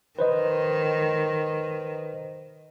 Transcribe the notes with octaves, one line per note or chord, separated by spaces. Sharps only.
D#3 B4 C5 D#5